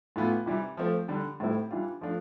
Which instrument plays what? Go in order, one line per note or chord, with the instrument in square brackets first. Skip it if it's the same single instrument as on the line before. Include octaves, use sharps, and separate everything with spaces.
[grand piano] A2 E3 B3 F4
C3 E3 G3
F3 A3 C4 F4
D3 G3 D4
A2 G3 C4 E4
E3 G3 D4 F4
F3 A3 D4 F4